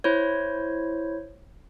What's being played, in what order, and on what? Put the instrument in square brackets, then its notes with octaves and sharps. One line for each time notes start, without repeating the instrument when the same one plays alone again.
[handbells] E4 C5 C#5